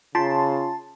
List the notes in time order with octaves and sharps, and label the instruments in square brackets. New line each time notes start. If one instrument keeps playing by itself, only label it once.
[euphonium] C#3 [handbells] F4 [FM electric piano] A5 C6